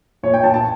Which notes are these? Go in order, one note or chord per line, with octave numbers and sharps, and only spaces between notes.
A#2 C#5
G5
A#2 A5
A5